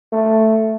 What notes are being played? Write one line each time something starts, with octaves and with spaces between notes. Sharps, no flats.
A3